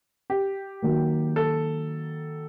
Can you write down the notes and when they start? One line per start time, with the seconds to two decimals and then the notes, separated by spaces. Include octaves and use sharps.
0.30 G4
0.82 D#3 F#3 A#3
1.36 A4